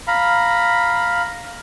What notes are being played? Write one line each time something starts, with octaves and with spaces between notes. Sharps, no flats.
F5 A#5 B5